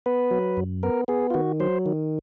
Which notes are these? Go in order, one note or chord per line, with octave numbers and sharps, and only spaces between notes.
B3 B4
F#3
F#2
B3 A#4
B3 G#4
F4
D#3 F#4
F#3 C5
D#3